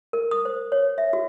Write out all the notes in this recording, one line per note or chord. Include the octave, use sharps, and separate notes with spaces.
A#4
D#6
C5
C#5
E5
F#4